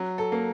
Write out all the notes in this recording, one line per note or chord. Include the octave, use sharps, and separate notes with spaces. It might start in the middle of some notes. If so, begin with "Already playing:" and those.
Already playing: F#3
A4
A#3